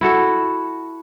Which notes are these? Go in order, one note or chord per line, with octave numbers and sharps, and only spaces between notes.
E4 F#4 A4